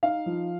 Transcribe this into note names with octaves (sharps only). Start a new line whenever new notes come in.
D#4 F5
F3